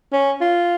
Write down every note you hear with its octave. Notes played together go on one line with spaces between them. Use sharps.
C#4
F4